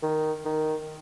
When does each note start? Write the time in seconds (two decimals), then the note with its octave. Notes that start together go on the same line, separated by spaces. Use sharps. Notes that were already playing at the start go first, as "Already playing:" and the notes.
0.03 D#3
0.45 D#3